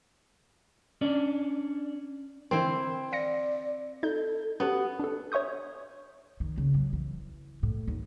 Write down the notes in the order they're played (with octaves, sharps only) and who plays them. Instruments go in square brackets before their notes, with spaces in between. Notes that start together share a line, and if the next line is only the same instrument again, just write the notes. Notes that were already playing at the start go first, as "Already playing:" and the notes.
[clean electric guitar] C#4 D4 D5
[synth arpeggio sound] D3 E3 A#4 [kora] C4 E4
[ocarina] D5 [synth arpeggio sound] F5 A#6 C#7
[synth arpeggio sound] D#4 G6 [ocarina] A4
[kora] B3 [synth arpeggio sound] C#4 F#4 A4 [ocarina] G4
[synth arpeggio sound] D4 A4
C#5 E5 C#6 D#6 G6
[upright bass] D#3
C#3
F#3
E3
A2
D#2